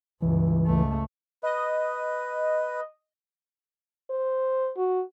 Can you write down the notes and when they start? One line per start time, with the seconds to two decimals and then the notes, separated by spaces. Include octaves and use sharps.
0.22 G1 C#2 E3
0.66 C#2 A3
1.43 B4 D#5
4.10 C5
4.77 F#4